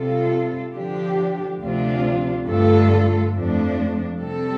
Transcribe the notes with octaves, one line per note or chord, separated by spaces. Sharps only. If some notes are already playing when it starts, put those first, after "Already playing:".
Already playing: C3 G3 F4 A4
D3 F3 D4 G4
D2 C3 F3 D4 F4
G2 D3 A3 F4 A4
F2 F3 A3 D4
C3 G3 C4 A4